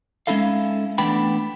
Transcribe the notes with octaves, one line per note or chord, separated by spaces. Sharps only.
G#3 C#4 D#4 E4 A4 F5
E3 A3 B3 D4 G5 B5